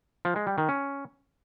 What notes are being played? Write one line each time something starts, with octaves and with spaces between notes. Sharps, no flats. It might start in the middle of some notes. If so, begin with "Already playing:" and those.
F3
G#3
G3
D#3
C#4